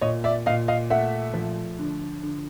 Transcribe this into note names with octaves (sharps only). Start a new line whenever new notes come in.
A#2 C#5 D#5
D5 E5
A#2 D#5 F5
D#5 F5
A3 E5 F#5
F3
D3
D3